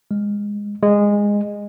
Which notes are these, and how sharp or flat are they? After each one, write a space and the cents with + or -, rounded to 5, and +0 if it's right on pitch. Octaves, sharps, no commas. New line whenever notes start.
G#3 -15
G#3 -15